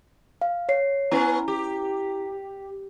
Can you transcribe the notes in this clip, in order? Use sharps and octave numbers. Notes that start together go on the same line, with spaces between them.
F5
C#5 C7
B3 C#4 E4 B4 A#5
G4